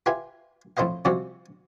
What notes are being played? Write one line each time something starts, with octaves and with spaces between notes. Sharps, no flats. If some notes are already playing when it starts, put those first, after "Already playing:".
F4 G4 B4 E5 G#5
F2 A2 A4 C5 D#5 F5
C3 F3 G3 G#3 C4 F#4